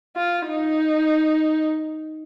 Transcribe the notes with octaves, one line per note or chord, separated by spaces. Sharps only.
F4
D#4